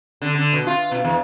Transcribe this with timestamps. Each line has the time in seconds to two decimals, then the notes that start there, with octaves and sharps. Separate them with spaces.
0.22 D3
0.35 D3
0.53 B2
0.67 F4
0.92 B2
1.05 E2